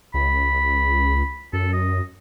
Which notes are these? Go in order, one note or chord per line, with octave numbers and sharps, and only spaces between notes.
C#2 B5
F#2 A4
D#5